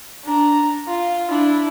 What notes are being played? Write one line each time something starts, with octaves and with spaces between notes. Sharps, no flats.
D4 A#5
F4
D4 E4